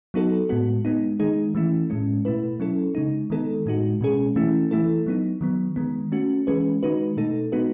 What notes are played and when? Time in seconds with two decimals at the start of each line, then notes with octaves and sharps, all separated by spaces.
0.14 F#3 B3 D#4 F#4 A4
0.49 A2 G#3 B3 F#4
0.85 G#3 B3 D#4
1.20 D#3 G#3 D#4 G#4
1.55 E3 A3 C#4 E4
1.90 A2 G#3 C#4
2.25 B2 A3 E4 B4
2.60 F#3 C#4 E4 A4
2.95 C#3 G#3 D#4
3.30 D#3 G#3 B3 D#4 A4
3.66 A2 G#3 D#4 F#4
4.01 B2 G#3 C#4 G#4
4.36 E3 A3 C#4 E4
4.71 E3 A3 E4 A4
5.06 F#3 B3 D#4
5.41 D#3 F#3 B3
5.76 D#3 G#3 B3
6.12 A3 C#4 F#4
6.47 E3 G#3 C#4 G#4 B4
6.83 D#3 G#3 D#4 F#4 B4
7.17 B2 A3 D#4 A4
7.52 G#3 B3 D#4 F#4 B4